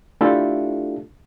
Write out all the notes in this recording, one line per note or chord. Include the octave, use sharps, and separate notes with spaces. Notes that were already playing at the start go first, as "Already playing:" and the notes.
A3 D4 E4 F4 G4 A4